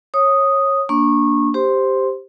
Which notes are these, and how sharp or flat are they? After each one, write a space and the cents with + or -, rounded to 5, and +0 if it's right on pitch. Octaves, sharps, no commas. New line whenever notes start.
C#5 -20 D#6 +0
A#3 +5 D4 -5 C#6 -25
G4 +0 C5 +0 C6 +0